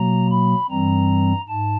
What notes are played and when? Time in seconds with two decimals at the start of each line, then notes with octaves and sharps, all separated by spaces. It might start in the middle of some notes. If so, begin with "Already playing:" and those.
Already playing: B2 F#3 A#3 A#5
0.31 B5
0.70 G2 E3 G3 C4 A#5
1.49 G#2 A5